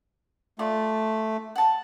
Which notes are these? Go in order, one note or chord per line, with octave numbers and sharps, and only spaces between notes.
A3 F4 D5
F#5 A5